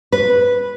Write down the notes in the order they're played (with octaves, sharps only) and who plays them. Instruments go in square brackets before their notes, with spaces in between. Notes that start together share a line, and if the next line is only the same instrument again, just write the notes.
[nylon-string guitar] B4